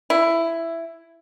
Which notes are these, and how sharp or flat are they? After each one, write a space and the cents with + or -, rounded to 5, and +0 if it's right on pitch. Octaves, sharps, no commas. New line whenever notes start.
E4 +10